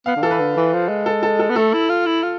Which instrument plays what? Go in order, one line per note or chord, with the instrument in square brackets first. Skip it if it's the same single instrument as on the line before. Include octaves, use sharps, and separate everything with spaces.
[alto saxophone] B3 [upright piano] F5
[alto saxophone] D3
[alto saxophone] E3 [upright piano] A4
[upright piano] B4
[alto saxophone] D3
E3
F3
G#3
[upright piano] A4
A4
A4
[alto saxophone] B3
[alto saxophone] A3 [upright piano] A4
[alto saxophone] E4
F4
E4
F4